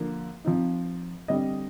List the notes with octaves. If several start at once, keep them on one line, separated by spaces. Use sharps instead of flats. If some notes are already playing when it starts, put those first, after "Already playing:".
Already playing: D3 F3 A#3
F3 C4 D#4
D3 G3 C4 D#5